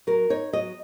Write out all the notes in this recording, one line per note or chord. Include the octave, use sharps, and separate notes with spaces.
F#3 A#4
D#4 C#5
F#3 D#5